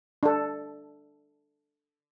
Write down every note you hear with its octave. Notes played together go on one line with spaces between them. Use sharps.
D4 A4